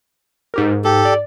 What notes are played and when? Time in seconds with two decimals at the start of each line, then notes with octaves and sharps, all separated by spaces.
0.54 G#2 G4 A#4
0.84 G#2 G4 A4
1.05 D5